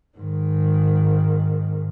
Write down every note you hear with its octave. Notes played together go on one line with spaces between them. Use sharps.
G#2 D#3